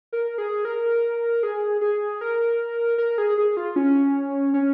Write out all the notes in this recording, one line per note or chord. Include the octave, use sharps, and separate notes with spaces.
A#4
G#4
A#4
G#4
G#4
A#4
A#4
G#4
G#4
F4
C#4
C#4